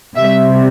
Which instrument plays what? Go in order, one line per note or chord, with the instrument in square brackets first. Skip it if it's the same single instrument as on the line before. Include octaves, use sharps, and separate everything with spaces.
[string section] C3 G3 E5